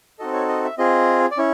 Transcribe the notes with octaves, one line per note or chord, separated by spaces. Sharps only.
C4 D#4 F#4 A4 D#5
C#5
D#5
E5
C4 F4 G#4 D#5
D5
C#4 E4 C#5